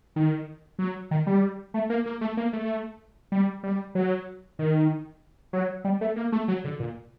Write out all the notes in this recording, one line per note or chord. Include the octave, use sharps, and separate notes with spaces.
D#3
F#3
D#3
G3
A3
A#3
A#3
A3
A#3
A3
G3
G3
F#3
D#3
F#3
G3
A3
A#3
A3
F#3
D3
A#2